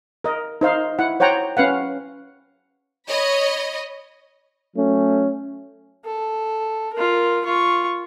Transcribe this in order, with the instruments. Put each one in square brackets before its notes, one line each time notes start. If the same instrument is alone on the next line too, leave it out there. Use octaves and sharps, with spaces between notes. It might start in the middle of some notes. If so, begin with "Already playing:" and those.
[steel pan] A#4 D#5
D#4 C5 F5
E4 F#5
C5 C#5 F#5 G5 A#5
C#4 B4 F5 F#5
[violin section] C#5 D#5 B5
[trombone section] F#3 A3 C#4
[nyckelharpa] A4
F4 A#4
F4 C#6